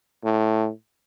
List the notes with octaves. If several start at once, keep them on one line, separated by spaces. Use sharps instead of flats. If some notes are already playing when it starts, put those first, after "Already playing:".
A2